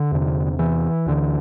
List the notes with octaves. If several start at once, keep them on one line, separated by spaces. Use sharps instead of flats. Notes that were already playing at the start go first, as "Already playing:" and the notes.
Already playing: D3
E2 C3
E3
D2 D3